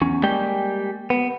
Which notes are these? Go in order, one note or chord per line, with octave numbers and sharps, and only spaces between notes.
E2 C#4
G3 G#3 A#3 G4 G5
B3